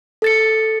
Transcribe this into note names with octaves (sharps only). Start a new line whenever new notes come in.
A4 A6 C#7